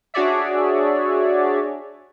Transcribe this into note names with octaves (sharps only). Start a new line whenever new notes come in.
D4 F#4 G#4 C#5 D5 E5